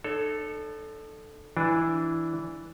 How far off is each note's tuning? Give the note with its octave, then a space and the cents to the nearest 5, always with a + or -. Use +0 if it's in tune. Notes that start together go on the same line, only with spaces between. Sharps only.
D#4 -45 A4 +0 C#5 +5
E3 +0 D4 +0 G#5 +20